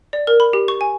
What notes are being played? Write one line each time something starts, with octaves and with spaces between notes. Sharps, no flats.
D5
A#4
B5
G4
C#6
G#5